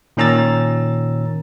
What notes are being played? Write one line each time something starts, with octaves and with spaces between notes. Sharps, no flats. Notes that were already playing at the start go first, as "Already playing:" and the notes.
A#2 D#3 C#4 A#5 E6 A6